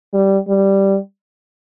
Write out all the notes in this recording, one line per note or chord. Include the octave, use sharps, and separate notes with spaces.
G3
G3